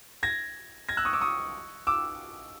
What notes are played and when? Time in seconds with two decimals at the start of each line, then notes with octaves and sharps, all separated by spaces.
0.23 G#6 A#6
0.89 G#6 A#6
0.97 E6 F#6
1.05 C#6 D#6
1.13 D6 E6
1.21 C#6 D#6
1.87 D6 E6